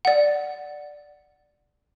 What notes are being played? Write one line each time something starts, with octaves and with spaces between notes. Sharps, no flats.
D5 F#5